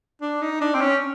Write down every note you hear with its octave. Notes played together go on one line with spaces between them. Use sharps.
D4
D#4
D4
C4
C#4